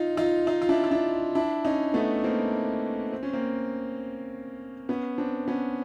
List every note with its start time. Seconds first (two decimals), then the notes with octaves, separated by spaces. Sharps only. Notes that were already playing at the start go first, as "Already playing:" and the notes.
Already playing: D#4 F4
0.17 D#4 F4
0.47 D#4 F4
0.62 F4
0.69 D4 E4
0.84 F4
0.91 D4 E4
1.35 D4 E4
1.65 C#4 D#4
1.94 A3 B3
2.24 A#3 C4
3.12 C4
3.23 C#4
3.33 A#3 C4
4.89 B3 C#4
5.18 C4 D4
5.48 B3 C#4